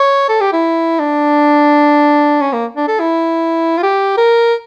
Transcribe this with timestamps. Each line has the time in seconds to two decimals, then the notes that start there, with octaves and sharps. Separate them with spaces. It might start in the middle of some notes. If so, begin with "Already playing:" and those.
Already playing: C#5
0.29 A4
0.41 G4
0.53 E4
0.99 D4
2.41 C#4
2.53 A#3
2.77 D4
2.88 A4
3.00 E4
3.78 F4
3.83 G4
4.17 A#4